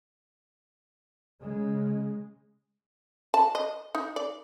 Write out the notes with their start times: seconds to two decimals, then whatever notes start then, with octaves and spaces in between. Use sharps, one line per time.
1.41 C#3 G#3
3.34 A5
3.55 D#5
3.95 D#4
4.16 D5